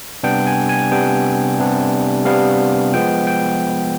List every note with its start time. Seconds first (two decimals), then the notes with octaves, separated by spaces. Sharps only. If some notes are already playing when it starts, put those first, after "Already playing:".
0.23 C3 G3 B3 D4 G5
0.47 G#5
0.69 G#5
0.91 C3 G3 B3 D4 G5
1.59 C3 G3 B3 D4
2.25 C3 G3 B3 D4 F5
2.93 F3 G#3 B3 G5
3.27 G5